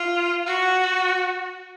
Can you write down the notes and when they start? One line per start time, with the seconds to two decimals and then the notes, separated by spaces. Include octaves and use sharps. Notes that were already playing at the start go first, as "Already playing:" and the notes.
Already playing: F4
0.46 F#4